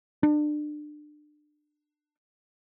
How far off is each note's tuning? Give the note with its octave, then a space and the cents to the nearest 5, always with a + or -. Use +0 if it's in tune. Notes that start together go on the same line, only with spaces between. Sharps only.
D4 +30